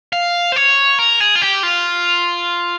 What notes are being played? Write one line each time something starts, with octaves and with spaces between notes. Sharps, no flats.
F5
C5
C#5
A#4
G#4
F4
G4
F4